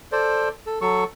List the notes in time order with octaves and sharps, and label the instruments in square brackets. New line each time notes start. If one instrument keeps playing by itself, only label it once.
[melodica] A4 C5 D5
A4
F#3 A4 C#6